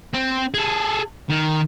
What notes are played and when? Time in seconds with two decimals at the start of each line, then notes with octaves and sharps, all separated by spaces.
0.14 C4
0.54 G#4 A4
1.29 D#3